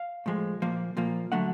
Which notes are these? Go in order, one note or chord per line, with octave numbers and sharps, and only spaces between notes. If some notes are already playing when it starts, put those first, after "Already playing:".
Already playing: F5
A2 F3 G#3
A#2 F3 A#3
A#2 F3 A#3
D3 F#3 A3 F#5